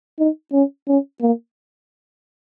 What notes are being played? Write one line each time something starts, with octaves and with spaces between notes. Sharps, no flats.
D#4
C#4
C#4
A#3